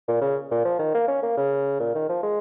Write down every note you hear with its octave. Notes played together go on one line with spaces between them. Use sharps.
A#2
C#3
A#2
F3
D#3
A#3
C#4
A#3
C#3
A#2
D#3
F3
G#3